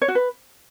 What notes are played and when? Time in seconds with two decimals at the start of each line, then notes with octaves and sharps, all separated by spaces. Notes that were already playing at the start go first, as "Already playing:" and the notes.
0.02 C#5
0.08 F#4
0.15 B4